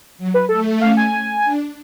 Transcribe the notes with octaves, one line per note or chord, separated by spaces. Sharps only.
F#3
B4
A3 A4
C#4 F5
G#5
D4